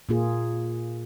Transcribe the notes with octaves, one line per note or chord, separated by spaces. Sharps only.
A#2 A#3 F4 G#4